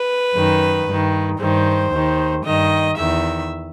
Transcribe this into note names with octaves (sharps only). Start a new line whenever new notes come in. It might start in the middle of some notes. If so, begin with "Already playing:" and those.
Already playing: B4
F#2 D#3
G2 D#3
G2 D#3 C5
D#2 D#3
G2 D#3 D#5
E2 D#3 E5